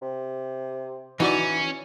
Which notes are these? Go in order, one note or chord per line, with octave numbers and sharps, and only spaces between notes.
C3
E3 C#4 D#4 F#4 D5